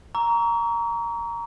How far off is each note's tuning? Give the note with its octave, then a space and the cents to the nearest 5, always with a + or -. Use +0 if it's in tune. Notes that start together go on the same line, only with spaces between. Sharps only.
A#5 +0 C#6 +40 E6 +0